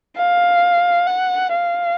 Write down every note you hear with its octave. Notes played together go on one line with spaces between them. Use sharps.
F5
F#5
F5